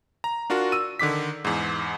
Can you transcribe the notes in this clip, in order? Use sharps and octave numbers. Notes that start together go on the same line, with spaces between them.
A#5
D4 F4 F#4 A#4
E6 D#7
D3 D#3 D6 B6
E2 G#2